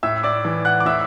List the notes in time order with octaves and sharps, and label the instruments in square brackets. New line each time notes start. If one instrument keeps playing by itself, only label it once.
[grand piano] A2 E5 E6
D5 D6
E3
F#5 F#6
D6
A2 E5 E6